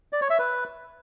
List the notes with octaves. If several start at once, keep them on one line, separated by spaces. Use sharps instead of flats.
D5
C#5
E5
B4